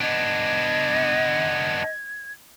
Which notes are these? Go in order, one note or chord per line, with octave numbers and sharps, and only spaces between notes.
B3 D4 D#5 G#6